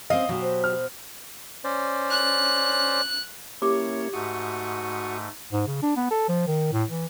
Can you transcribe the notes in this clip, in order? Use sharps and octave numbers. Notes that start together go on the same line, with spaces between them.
C4 C#4 D#5 F5
B2 F#3 G4
C5
F6
C#4 C5 D5
F#6
A#3 C#4 E4 G4 C#5 D6
G#2 A3 F#4 C#6 D#6
G#2
C#3
D4
B3
A4
F3
D#3
A2
E3